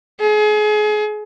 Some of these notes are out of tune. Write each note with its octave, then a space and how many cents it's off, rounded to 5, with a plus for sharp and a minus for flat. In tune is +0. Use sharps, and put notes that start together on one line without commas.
G#4 +30